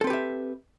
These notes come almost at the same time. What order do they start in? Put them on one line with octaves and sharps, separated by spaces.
A4 C4 B4 G4 E5